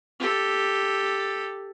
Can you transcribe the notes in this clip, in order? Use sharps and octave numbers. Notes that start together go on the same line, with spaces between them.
G4 A4